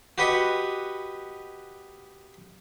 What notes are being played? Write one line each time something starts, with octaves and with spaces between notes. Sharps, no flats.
F#4 G4 B4 D#5 C#6